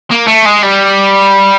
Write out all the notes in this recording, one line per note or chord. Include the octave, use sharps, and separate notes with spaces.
A#3
A3
G#3
G3